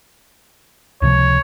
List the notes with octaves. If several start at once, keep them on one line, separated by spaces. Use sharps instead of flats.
C#2 C3 F3 C#5